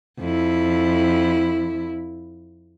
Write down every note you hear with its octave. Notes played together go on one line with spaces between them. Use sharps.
F2 E4